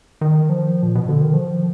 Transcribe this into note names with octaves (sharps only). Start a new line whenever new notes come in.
D#3
F3
A#2
B2
D3
D#3
F3